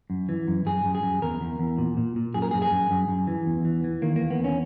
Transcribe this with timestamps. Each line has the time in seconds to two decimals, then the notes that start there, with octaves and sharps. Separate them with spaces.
0.10 F#2
0.29 E3
0.47 F#2
0.66 F#2 G#4
0.85 F#2
0.95 G#4
1.03 F#2
1.22 E2 A#4
1.41 E2
1.60 E2
1.78 A#2
1.97 A#2
2.16 A#2
2.34 F#2 G#4
2.42 A#4
2.51 F#2 G#4
2.62 G#4
2.71 F#2
2.91 F#2
3.08 F#2
3.27 E3
3.46 E2
3.65 E3
3.84 E3
4.02 D#3 A#3
4.16 E2 A#3
4.30 B3
4.39 E2
4.44 C#4